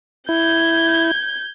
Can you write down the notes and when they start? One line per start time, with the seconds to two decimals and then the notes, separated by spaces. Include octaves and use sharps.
0.29 E4 G6 G#6